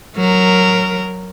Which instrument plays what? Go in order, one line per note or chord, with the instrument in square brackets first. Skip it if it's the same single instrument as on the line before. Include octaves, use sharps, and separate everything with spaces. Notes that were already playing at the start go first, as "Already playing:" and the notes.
[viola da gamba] F#3 A#4